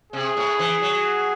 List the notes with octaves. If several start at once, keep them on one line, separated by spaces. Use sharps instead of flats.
C3 G#4
A2
E3
F#3